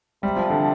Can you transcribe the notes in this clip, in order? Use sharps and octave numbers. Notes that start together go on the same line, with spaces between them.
C3 G3
F3
D3